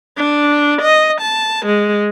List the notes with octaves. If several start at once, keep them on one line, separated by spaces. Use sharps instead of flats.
D4
D#5
A5
G#3